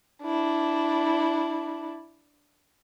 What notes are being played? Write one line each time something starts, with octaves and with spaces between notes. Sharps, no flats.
D4 E4